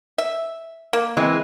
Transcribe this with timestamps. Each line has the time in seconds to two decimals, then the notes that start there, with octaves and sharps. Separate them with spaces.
0.18 E5
0.93 A#3
1.17 E3 G#3 C4